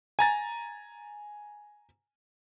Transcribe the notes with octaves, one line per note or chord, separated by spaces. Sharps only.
G#5 A#5 A6